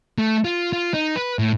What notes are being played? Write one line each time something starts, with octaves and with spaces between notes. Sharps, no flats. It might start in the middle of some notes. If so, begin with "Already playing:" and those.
A3
F4
F4
D#4
B4
A2